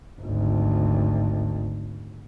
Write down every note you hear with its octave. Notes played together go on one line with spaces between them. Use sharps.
G#1 D2